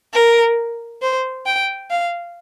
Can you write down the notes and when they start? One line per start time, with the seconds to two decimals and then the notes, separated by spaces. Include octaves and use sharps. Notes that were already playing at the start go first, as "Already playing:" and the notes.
0.13 A#4
1.02 C5
1.46 G5
1.90 F5